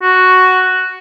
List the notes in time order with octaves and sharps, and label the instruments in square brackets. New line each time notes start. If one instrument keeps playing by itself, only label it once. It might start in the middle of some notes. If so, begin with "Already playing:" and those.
[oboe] F#4